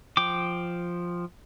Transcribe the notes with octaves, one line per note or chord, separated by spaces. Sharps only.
F3 G5 D6